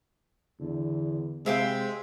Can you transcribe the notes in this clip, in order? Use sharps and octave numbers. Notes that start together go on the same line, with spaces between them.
E2 D3
C3 G#3 C5 E5 F5 G5